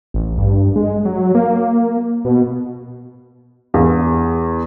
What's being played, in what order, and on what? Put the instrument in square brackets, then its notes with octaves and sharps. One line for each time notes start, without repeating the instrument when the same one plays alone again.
[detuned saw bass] A1
G2
G#3
F#3
A#3
B2
[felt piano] E2